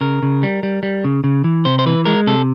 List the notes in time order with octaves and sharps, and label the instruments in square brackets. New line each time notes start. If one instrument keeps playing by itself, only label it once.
[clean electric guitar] C#3 A#4
C#3
G3
G3
G3
C#3
C#3
E3
C3 C5
C5
E3 B4
G#3 A#4
C3 A4